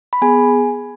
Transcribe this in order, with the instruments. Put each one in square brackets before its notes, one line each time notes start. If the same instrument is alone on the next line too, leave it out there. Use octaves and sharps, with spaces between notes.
[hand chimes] B5
B3 G#4 G#5